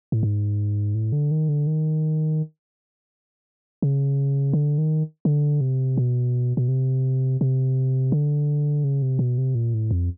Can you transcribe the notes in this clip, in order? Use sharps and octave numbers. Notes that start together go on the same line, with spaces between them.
A2
G#2
A2
D3
D#3
D3
D#3
C#3
D3
D#3
D3
C3
B2
B2
C3
C3
D3
C#3
C3
B2
C3
A#2
A2
F2